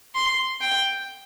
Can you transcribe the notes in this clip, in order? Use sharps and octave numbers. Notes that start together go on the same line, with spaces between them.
C6
G5